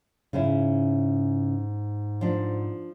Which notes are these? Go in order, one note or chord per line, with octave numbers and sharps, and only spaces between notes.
G#2 C#3 C#4 E4
F3 D4